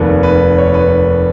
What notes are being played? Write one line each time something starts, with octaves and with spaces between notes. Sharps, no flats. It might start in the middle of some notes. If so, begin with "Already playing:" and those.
Already playing: F1 D#2 D#3 B4
B4
C#5
B4